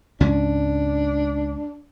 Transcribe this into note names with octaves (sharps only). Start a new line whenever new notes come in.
C#2 G#2 C#4 D4